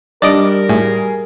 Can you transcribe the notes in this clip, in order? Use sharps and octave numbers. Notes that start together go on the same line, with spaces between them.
G3 D4 A#4 D5 D#5 D6
A2 G#4